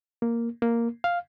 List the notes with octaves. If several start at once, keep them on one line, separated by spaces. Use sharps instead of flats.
A#3
A#3
F5